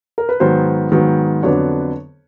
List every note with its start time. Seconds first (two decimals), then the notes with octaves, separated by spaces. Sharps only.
0.18 A#4
0.29 B4
0.40 G#2 D#3 F#3 B3 C5
0.92 G#2 D#3 F#3 B3
1.43 F2 D3 F#3 B3 D4 C#5